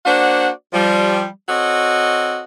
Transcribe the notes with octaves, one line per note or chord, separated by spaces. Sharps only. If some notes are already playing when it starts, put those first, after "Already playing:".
A#3 D4 F#4 C5 D5 F#5
F3 G3
C4 F#4 A4 C#5 D#5